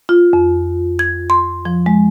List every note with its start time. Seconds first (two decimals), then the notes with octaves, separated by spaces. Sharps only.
0.09 F4
0.33 F2
0.99 G#6
1.30 C6
1.65 F3
1.86 G#3